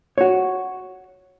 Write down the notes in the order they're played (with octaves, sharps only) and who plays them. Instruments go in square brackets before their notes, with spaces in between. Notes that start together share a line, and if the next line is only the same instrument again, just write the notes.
[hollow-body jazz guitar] F#4 C#5